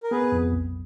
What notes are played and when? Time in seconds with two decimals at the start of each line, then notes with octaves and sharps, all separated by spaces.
0.03 A#4
0.11 B3 G#4 B4
0.32 F2
0.53 B1